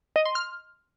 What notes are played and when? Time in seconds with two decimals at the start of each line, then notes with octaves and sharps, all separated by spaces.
0.16 D#5
0.26 C6
0.35 F6